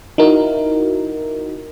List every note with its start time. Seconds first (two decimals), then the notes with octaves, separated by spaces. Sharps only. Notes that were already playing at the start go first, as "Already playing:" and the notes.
0.18 D#4 E4 F#4 A#4